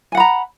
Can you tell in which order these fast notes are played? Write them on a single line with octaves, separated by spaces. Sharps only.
G#5 F#5 B5 A#5